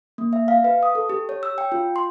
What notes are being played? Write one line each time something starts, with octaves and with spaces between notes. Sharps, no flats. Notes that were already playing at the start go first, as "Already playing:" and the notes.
A#3
E5
F5
B4
D#6
A4
G4
C#5
E6
G5
F4
C6